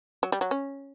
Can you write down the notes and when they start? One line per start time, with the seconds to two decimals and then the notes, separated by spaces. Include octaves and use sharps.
0.23 F#3
0.32 G3
0.41 F#3
0.51 C#4